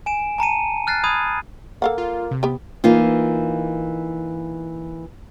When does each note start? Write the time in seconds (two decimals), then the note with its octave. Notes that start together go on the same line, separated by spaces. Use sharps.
0.06 G#5 D7 E7
0.38 A5 A#5 C#7 D#7
0.87 F6 F#6 A6 C7
1.04 B5 D#6 G#6 D#7
1.82 A#3 A4 F5 F#5
1.98 F4
2.31 C3
2.43 B3 G4
2.84 E3 A#3 D#4 F4